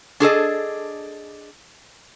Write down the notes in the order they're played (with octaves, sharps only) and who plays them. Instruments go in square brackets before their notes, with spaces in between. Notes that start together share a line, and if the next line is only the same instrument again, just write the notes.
[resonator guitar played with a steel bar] D4 G#4 A4 D#5